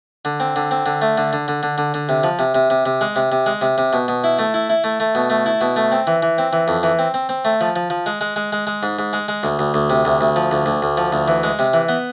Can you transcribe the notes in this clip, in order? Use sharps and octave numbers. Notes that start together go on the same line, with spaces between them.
D3
C4
D3
C4
D3
A3
D3
D3
D3
D3
D3
D3
C3
F3
C3
C3
C3
C3
G#3
C3
C3
G#3
C3
C3
B2
B2
E4
A3
E4
E4
A3
A3
B2
A3
E4
B2
A3
C4
E3
E3
C4
E3
F2
E3
C4
C4
C4
A3
F3
F3
F3
G#3
G#3
G#3
G#3
G#3
G#2
G#2
G#3
G#3
D2
D2
D2
C3
D2
D2
F3
D2
D2
D2
F3
D2
E3
G#3
C3
E3
B3